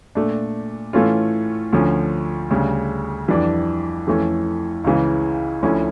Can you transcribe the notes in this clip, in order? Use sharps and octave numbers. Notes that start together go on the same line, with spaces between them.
A#2 A3 D4
A2 E3 A3 C#4 F4
D2 D3 F3 C#4
D2 C#3 G3
F2 E3 G3 D4
F2 E3 A3 C#4
C#2 C#3 E3
D2 D3 F3 C#4 E4